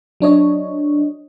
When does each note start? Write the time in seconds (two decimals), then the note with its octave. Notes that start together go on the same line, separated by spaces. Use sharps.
0.20 F#3 D4 C#5 D#5